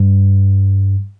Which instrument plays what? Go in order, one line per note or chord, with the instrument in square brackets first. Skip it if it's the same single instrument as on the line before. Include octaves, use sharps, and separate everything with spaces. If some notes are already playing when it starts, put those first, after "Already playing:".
Already playing: [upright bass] G2